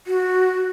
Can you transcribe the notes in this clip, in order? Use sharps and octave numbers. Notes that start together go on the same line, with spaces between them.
F#4